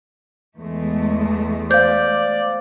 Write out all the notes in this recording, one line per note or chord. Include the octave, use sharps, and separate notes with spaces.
E2 G#3 A3
C5 D5 F5 G6